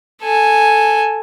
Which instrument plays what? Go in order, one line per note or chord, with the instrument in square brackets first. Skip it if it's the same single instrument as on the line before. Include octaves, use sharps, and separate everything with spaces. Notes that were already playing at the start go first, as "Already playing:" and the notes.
[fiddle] A4 G#5